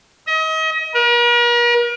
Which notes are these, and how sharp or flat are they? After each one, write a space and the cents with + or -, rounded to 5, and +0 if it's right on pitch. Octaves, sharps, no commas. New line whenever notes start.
D#5 +35
A#4 +45